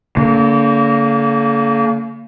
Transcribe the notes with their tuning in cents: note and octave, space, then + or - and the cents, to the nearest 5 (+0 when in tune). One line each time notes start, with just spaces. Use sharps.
D3 -45 A#3 -20